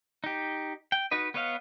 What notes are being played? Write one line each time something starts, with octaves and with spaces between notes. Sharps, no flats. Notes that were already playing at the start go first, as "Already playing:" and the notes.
D#4 G4
G5
D#4 F#4 B4 D#5
B3 B4 C#5 D#5 F5